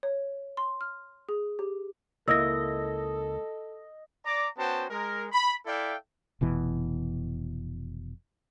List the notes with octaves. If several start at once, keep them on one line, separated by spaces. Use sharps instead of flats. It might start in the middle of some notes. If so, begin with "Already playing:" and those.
C#5
C6
F6
G#4
G4
C#2 A#3 E4 A4 D#5 E6 A#6
D5 A#5 D6
B3 C#4 F#4 C5 G5 A5
G#3 A#4
B5
E4 A4 D5 E5 F5 G5
F1 B2 E3